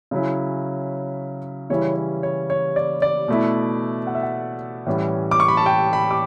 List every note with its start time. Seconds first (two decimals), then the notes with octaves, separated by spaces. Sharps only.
0.11 C#3 F#3 C#4 E4
1.70 C#3 E3 G3 C#4 E4 C#5
1.96 C#5
2.23 C#5
2.50 C#5
2.76 D5
3.02 D5
3.28 B2 A3 E4
4.07 F#5
4.15 E5
4.23 F#5
4.86 A2 E3 G3 C#4
5.31 D6
5.40 C#6
5.48 B5
5.57 A5
5.66 G5
5.93 B5
6.11 D6